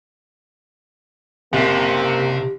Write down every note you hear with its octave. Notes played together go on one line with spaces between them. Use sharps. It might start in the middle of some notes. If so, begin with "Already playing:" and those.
F#1 C3 A#3 G4